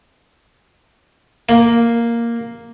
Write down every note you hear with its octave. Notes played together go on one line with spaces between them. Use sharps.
A#3